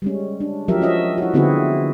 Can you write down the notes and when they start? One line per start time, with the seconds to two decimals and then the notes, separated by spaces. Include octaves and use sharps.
0.02 G3 G#3 C#4
0.40 D4
0.68 F3 F#3 G4 A#4 E5
0.82 C#4 D#5 E5
1.18 E4 F#4
1.34 D3 B3 C4 E4 F#4 G#4